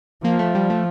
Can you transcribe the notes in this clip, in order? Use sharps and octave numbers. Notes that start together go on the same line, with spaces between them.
F3 A#3
A3
G3
A3